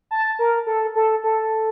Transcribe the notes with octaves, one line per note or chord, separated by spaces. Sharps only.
A5
A#4
A4
A4
A4